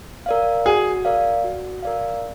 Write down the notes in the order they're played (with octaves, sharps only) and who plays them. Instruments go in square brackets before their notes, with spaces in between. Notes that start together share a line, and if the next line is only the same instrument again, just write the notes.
[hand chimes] A#4 D5 F5
[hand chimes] F#4 [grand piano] G#4
[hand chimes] A#4 D5 F5
F#4
A#4 D5 F5